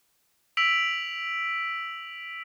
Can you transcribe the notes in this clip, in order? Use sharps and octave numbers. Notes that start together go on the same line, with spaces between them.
E6 B6 D7 F7 F#7